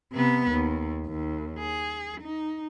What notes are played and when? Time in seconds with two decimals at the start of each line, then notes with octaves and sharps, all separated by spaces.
0.13 C3 B3
0.52 D#2
1.06 D#2
1.59 G#4
2.21 D#4